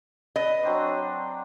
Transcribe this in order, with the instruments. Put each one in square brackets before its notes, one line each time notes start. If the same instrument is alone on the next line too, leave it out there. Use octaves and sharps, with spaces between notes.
[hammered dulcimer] B4 [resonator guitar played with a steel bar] D#5
[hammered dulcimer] F#3 C4 D4